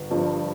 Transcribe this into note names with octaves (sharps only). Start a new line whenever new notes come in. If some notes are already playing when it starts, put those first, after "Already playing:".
Already playing: G1
G2 F3